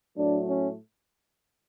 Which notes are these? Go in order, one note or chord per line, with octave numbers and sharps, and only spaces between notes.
A2 F#3 A3 D4
C#4